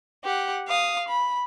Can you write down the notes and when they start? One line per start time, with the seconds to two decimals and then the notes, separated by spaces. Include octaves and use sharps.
0.24 G4 F#5
0.67 F5 D#6
1.08 B5